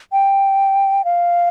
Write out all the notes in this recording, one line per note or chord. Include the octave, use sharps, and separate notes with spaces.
G5
F5